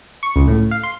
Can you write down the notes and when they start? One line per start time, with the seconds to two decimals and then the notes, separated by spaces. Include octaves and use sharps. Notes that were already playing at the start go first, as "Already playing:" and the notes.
0.23 C#6
0.36 C#2
0.48 A2
0.71 F5
0.83 C6